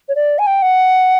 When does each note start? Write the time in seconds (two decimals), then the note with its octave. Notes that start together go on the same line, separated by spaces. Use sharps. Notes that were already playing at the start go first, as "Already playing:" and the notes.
0.08 C#5
0.15 D5
0.38 G#5
0.46 G5
0.62 F#5